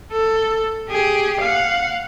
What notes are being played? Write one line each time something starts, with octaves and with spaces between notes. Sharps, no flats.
A4
G4 G#4
F5 F#5